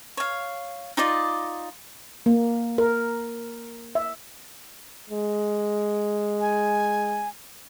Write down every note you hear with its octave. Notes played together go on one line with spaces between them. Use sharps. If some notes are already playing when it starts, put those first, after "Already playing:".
C#5 F5
D#4 F4 D5 D#5
A#3
A#4
E5
G#3
G#5